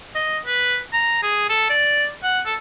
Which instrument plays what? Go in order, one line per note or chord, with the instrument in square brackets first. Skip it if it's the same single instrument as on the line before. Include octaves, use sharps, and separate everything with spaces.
[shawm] D#5
B4
A#5
G#4
A4
D5
F#5
A4